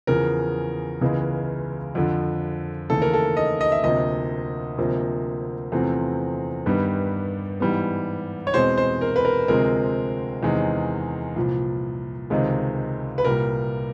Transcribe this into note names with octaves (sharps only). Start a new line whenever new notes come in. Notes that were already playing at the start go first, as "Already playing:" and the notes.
E2 C#3 F3 A#4
C#2 C#3 E3 G#3 B3
F2 D3 F3
D#2 C#3 E3 A3 A4
A#4
A4
D#5
D#5
E5
D2 C3 F3 A#3 D#5
D2 C3 F3 A#3
E2 C3 F3 A3 C4
G2 D#3 G3 B3
G#2 E3 G3 B3
C#5
E2 B2 G#3 C4 C5
C5
A#4
B4
A#4
D2 C3 F3 G#3 C4 A#4
E2 C3 D#3 G#3
C2 A#2 F3
C#2 C3 D#3 G#3
B4
C2 A#2 G3 A#4